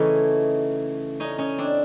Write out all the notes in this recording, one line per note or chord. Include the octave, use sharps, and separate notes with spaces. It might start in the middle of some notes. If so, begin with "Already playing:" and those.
Already playing: C#3 E3 A3 C#4 D#4
C#4 D#4
C#4 D#4
C4 D4